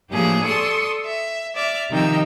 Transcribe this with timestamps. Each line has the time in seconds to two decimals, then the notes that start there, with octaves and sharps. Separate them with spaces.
0.11 A2 F3 A#3 D4 G4 G#4
0.44 A4 D5 C6 C#6 D#6 E6
1.05 E5
1.54 D5 E5 F6
1.91 C3 D#3 F3 D#4 G5 E6